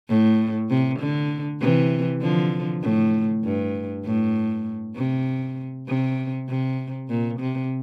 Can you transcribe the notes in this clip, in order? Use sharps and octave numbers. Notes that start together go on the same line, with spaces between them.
A2
C3
D3
C3 E3
D3 F3
A2
G2
A2
C3
C3
C3
A#2
C3